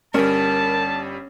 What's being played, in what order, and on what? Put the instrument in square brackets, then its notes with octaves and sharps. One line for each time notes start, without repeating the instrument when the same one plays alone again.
[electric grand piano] G1 G3 [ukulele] C#4 [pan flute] A#4 [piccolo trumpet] A5